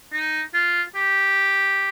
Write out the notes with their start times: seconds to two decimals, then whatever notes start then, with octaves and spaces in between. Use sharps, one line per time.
0.12 D#4
0.54 F4
0.95 G4